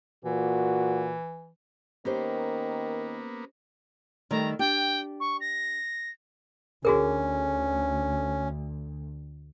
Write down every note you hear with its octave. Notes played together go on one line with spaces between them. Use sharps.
A#2 E3 F#4
D#3 A#3 B3 C#4 G4 C5
D#3 G3 A3 A#5
D4 G4 G5
C#6
A#6
D2 C#4 F#4 G#4 A#4